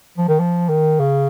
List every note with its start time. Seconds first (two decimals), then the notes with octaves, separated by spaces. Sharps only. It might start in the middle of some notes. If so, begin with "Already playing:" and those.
0.18 F3
0.28 D#3
0.39 F3
0.69 D#3
1.00 C#3